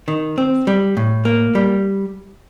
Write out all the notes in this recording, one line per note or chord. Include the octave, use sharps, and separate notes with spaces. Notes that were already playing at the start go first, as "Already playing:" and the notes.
D#3
C4
G3
A2
A#3
G3